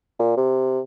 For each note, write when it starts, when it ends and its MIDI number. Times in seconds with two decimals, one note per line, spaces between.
0.19 0.35 46
0.37 0.80 48